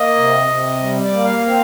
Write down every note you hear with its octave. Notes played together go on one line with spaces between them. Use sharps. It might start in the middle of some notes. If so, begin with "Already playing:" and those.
Already playing: A#3 D#5
C3
C3
G3
D5
A#3
F5
C4 F5